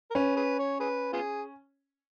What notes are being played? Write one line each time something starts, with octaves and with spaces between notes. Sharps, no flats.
A#4
C#4 B4
G#4 B4
C#5
G#4 B4
B3 F4 G#4